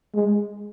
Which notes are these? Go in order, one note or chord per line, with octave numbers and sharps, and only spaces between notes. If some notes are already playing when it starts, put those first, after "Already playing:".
G#3